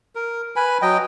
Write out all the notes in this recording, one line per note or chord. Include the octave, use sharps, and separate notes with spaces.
A#4
B4 G#5 B5
F#3 D#5 G5